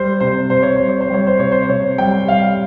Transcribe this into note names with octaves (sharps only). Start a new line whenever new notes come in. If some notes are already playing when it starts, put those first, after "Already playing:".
Already playing: G3 C5
C3 C5
C3 C5
C#5
G3 C5
C#5
C5
G3 C#5
C5
C3 C#5
C5
C3 C#5
G3 G5
G3 F5